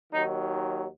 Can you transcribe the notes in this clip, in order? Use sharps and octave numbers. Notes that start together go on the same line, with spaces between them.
D#2 D#3 F#3 D#4